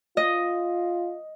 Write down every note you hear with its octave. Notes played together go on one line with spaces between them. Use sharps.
F4 D#5